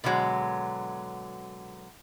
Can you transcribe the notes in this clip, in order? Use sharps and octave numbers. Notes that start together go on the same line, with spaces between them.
B2 D3 E3 F#3 G#3